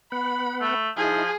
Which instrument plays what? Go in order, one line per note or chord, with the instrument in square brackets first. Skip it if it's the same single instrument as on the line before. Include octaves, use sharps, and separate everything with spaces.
[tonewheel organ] B3 F#5 [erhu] B5
[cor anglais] A3
[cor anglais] F3 [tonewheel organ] D#4 E4 [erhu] G#4